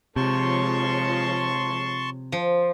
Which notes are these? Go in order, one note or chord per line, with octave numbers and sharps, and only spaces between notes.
C3 F3 G#3 C#5 A5 C6 C#6
F3